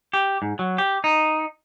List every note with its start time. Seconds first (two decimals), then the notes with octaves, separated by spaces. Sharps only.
0.13 G4
0.42 G#2
0.59 F#3
0.78 G4
1.04 D#4